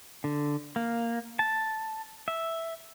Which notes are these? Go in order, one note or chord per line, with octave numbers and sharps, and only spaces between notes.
D3
A#3
A5
E5